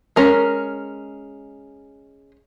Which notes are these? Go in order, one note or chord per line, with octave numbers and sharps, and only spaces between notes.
G#3 C#4 A#4